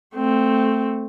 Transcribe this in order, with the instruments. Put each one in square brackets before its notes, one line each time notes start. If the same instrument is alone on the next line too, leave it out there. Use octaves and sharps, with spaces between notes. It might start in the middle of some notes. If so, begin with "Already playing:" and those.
[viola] A3 C4